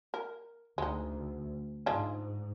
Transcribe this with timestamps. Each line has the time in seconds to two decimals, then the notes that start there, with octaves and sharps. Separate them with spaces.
0.14 A#4
0.78 D2 G#3 D#4
1.86 G#2 G#3 D4 F4